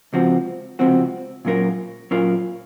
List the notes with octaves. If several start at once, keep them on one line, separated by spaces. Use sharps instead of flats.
C#2 C3 F3 C4 F#4
C#2 C3 F3 C4 F#4
A#2 F#3 C#4 F4 A#4
A#2 F#3 C#4 F4 A#4